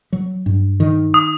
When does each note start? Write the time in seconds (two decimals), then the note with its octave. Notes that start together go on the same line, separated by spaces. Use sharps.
0.12 F#3
0.46 G2
0.80 D#3
1.14 D#6